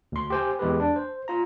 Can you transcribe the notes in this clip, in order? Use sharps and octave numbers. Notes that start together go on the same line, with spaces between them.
D2 C6
G4 C5 G#5
E2 G#3 G4 B4
D4
C5
F4 A#5